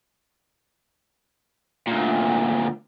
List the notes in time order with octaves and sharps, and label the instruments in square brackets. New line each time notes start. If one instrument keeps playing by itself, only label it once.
[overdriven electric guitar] D2 A#2